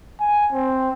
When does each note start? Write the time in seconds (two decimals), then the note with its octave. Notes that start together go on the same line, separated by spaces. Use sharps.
0.20 G#5
0.53 C4